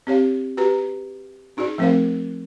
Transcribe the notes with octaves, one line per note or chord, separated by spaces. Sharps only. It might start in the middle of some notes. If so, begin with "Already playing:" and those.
C4 G4 C#5 F5
F#4 G4 B4 A#5
C#4 D#4 F#4 G#4 D5
F3 A3 C4 A#4 C5 F5